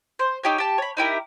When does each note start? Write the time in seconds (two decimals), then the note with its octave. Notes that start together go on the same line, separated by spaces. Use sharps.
0.19 C5
0.43 D#4 G4 C#5
0.58 G4 A5
0.78 C#5 B5
0.97 D#4 E4 G4 A#4